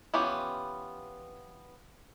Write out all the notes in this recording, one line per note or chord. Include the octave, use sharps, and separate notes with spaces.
E3 B3 C#4 F4 G4